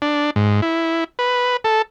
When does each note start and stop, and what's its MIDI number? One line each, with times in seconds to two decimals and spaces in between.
0.02 0.30 62
0.36 0.61 44
0.62 1.04 64
1.19 1.57 71
1.64 1.82 69